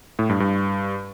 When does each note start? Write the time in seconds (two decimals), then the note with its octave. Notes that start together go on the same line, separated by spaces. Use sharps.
0.19 A2
0.29 G2
0.40 G2